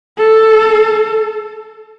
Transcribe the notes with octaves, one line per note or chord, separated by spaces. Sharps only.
A4